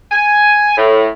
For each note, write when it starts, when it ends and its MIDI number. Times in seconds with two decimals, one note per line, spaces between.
0.12 0.75 80
0.77 1.09 45